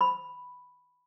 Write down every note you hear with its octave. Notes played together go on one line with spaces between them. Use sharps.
B5